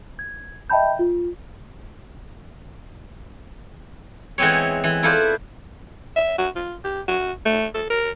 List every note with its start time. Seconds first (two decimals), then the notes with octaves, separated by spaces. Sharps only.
0.19 G#6
0.70 D#5 E5 G5 A5 B5 G6
0.99 F4
4.38 E3 G#3 B3 C4 C#5
4.84 E3
5.03 E4 F4 A4 B4 C5 D5
6.16 E5
6.38 F#4
6.56 F4
6.85 G4
7.08 F#4
7.46 A3
7.74 A4
7.90 A#4